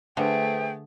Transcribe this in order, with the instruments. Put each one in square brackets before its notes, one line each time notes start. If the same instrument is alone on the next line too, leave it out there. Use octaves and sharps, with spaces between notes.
[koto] D3 [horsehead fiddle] A3 G#4 [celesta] B4 C5 E5 [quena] G5